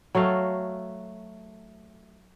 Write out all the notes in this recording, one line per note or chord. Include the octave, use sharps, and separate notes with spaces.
F#3 A3 A4 F5